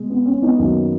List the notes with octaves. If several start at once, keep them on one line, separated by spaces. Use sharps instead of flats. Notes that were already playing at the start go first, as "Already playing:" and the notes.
Already playing: B2 G#3
B3
C#4
B3 D#4
F#2 D#3 A#3